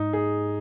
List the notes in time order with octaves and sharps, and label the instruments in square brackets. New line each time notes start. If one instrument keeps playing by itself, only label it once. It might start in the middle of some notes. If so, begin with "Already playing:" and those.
Already playing: [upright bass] G#2 [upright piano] D#4
[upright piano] G#4